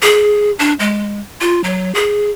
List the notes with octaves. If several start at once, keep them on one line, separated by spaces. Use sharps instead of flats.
G#4
D4
G#3
F4
F#3
G#4